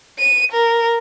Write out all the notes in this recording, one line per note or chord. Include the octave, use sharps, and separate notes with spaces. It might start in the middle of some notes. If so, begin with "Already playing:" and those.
D#7
A#4